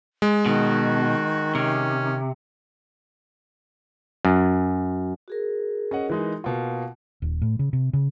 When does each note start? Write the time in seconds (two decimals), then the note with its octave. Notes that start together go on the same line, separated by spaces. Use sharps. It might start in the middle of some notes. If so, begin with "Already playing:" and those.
0.22 G#3
0.46 B2 D#3 F#4
1.55 C3 C#4
4.25 F#2
5.28 F#4 G#4 A#4
5.91 C#4 D#5 F#5
6.10 E3 G#3 D#4
6.44 B2 A#3 F4
7.22 D#1
7.42 A2
7.59 C#3
7.73 C3
7.93 C#3